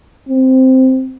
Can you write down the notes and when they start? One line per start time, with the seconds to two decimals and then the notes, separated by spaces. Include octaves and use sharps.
0.29 C4